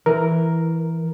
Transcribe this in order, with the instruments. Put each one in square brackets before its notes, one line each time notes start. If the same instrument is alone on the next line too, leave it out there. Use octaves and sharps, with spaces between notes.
[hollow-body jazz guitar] E3 [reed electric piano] A#4